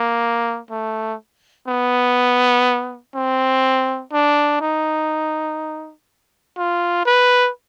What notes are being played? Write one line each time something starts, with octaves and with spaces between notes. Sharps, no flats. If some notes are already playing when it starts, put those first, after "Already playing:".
Already playing: A#3
A3
B3
C4
D4
D#4
F4
B4